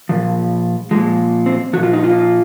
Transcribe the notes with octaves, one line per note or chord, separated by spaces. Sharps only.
A#2 F3
A#2 F3 G#3
C4
A#2 F3 F#4
F4
D#4
F4